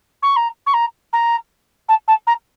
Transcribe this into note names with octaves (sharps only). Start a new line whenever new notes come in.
C#6
A#5
C#6
A#5
A#5
A5
A5
A#5